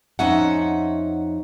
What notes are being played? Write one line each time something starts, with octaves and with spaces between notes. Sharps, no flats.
F2 C#4 D#4 E5 F#5